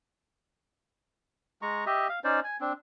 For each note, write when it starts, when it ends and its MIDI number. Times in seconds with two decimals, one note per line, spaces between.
1.62 1.85 56
1.62 1.85 82
1.62 1.85 85
1.86 2.08 67
1.86 2.08 75
1.86 2.08 76
2.09 2.19 77
2.24 2.40 61
2.24 2.40 63
2.24 2.40 72
2.24 2.40 74
2.44 2.57 80
2.61 2.73 60
2.61 2.73 62